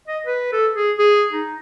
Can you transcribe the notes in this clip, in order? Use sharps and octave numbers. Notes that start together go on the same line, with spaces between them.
D#5
B4
A4
G#4
G#4
D#4